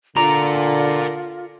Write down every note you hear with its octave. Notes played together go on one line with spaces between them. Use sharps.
D3 F4 A#4 D5 A#5